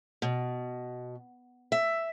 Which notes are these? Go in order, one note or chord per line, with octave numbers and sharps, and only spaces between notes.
B2
E5